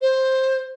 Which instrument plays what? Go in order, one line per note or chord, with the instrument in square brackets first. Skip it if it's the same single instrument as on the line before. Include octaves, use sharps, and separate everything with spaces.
[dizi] C5